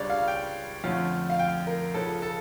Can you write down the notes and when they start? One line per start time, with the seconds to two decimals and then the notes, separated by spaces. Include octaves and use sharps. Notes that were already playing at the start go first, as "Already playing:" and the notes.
Already playing: C#2 C#3 G3 D4 C#5 D5
0.10 F5
0.28 G5
0.84 F2 D3 A3 C#4 F4
1.30 F5
1.39 G5
1.67 A#4
1.94 C#2 C#3 F3 A4
2.22 A4